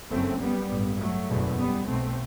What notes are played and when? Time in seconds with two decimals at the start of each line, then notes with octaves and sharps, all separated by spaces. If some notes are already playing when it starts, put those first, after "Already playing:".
0.10 F#1 F#2 A3 C4
0.40 G3 B3
0.70 A1 G2
0.99 F#3 A3
1.29 F#1 E2 B2
1.58 G3 B3
1.87 B1 B2 A3 C4